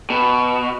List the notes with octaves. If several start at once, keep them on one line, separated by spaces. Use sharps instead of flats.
B2